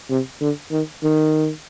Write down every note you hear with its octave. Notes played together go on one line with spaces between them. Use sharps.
C3
D3
D#3
D#3